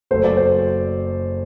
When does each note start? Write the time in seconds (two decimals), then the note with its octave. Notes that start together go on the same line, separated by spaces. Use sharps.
0.11 F#1 F#2 F#3 A3 C5
0.24 D5
0.37 C5